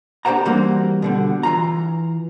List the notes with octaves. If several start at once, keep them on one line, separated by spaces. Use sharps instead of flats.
D4 G4 A4 C5 F#5 A#5
E3 G3 A#3 C4 F#4
B2 D3 G3
E3 F4 A#5